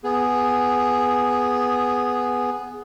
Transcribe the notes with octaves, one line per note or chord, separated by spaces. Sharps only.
B3 G#4